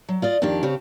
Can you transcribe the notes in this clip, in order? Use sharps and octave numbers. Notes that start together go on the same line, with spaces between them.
F#3
F4 D5 D#5
F2 D#3 D4 F4 G4
C#3 C4 G4 C#5